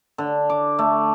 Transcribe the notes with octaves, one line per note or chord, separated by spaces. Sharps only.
D3
D6
A3